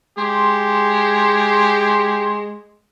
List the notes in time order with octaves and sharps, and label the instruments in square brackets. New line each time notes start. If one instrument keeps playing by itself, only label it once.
[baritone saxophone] G#3 [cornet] G4 [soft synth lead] C6